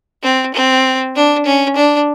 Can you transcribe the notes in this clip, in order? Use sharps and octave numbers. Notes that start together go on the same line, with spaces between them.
C4
C4
D4
C#4
D4